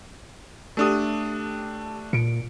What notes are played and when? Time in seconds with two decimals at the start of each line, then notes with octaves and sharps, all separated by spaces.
0.77 A3 D4 G4 A4 D#6
2.13 A#2 C#7 D7